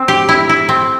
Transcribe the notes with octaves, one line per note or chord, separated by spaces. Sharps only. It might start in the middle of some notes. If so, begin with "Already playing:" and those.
Already playing: C4
G4
E4
E4
C4